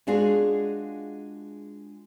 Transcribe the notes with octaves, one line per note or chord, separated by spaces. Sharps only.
G#3 D4 F4 F#4 G#4